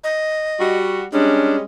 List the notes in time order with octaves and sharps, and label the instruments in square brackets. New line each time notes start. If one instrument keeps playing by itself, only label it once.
[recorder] D#5
[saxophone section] G3 F#4
[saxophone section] G3 G#3 C#4 [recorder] D4